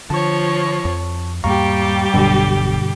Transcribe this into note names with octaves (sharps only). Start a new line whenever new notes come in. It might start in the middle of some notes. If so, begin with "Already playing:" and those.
D3 F3 C#5 A5 C#6
F2
E2 G#2 G3 A#3 G4 F5 A#5 C#6
D1 G2 B2 D3 F#3 B3